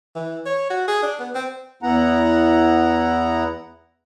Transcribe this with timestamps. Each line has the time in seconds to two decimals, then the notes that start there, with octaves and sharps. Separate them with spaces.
0.15 E3
0.46 C#5
0.70 F#4
0.88 G#4
1.03 D4
1.20 B3
1.35 C4
1.83 E2 B3 E4 F#5 A#5